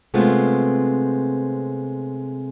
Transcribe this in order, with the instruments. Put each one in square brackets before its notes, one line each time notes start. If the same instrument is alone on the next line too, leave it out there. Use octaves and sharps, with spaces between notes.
[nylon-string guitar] C3 G#3 A3 B3 C4 F4